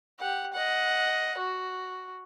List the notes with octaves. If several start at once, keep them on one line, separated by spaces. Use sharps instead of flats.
G4 F#5
D#5 F#5
F#4